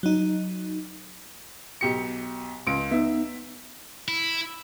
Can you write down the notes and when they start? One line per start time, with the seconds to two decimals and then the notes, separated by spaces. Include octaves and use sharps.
0.03 F#3 D#4
1.81 B1 G4 C#7
2.67 C#2 D7
2.91 B3 D#4 E5
4.08 E4